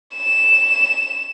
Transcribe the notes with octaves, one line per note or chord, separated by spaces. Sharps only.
E7